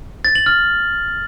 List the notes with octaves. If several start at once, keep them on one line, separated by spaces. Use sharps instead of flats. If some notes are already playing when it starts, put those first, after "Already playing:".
A6
F#7
F6